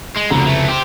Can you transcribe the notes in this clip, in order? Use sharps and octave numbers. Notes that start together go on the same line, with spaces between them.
G#3
F1 C#2 B2 D3 A#5
E3 A3
G4 C5